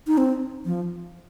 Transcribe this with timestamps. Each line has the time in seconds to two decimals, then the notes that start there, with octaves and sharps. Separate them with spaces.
0.07 D#4
0.18 C4
0.66 F3